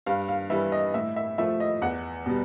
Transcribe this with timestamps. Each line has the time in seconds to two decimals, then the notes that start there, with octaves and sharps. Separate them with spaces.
0.06 G2 F5
0.28 F5
0.50 E3 G3 E5
0.72 D#5
0.94 A2 E5
1.16 E5
1.38 F3 A3 E5
1.60 D#5
1.82 E2 F#5
2.26 B2 G3